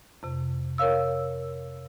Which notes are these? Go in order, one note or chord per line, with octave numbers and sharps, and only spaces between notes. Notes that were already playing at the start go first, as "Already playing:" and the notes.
F2 C3
A#4 C#5 F5 E6